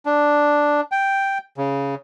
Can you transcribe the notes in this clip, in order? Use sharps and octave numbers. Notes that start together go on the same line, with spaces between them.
D4
G5
C#3